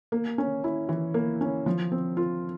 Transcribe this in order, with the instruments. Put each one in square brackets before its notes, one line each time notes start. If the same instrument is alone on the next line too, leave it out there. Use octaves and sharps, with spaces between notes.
[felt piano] A#3
C#4
E4
E3
A#3
C#4
F3
C4
F4